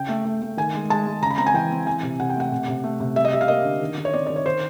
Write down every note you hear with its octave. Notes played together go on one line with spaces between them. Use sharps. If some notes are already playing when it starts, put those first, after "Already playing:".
Already playing: C#3 G5
A3
A3
A3
D#3 G#5
G#3
G#3 A5
G#3
C#3 A#5
B5
C4 A#5
G#5
E3 G5
C4
E3 G#5
C3
C3 F#5
G5
A3 F#5
C3
C3
A3
C3
G3 E5
D#5
G3 E5
F5
A#3 D#5
D3
D#3
D#3
C#5
C4 D5
D#3 D5
C#5
D#3 C5